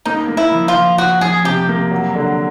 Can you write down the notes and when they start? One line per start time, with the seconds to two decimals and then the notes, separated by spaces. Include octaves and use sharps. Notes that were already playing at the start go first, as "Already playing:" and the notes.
0.05 A#3 D#4
0.28 A#3
0.37 E4
0.52 F3
0.68 F4
0.75 F3
0.98 F3 F#4
1.21 F3 G#4
1.44 C3 G4
1.69 A#3
1.91 F#3
2.15 D3